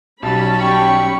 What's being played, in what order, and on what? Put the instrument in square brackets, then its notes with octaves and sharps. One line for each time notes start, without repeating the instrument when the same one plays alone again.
[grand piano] B1 F#3 [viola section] G3 C#4 B5 [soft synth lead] A5
[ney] G5 [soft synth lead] C#6